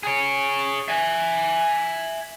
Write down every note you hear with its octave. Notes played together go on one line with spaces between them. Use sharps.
G#4 C#5
E5 G#5